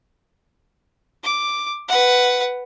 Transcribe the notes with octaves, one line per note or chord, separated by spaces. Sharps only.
D6
B4 F#5